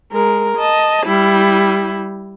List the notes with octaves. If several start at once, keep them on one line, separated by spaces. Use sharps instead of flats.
G#3 A#4
D#5 A5
G3 E4